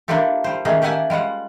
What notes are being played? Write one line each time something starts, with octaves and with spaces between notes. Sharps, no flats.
A#3 D4 E4 F4 G4 A4
G3 C5
D#3 A3 C#4 D#4 G#4
A#3 G4 E5 F#5 G#5 A5
G3 G#3 F4 F#5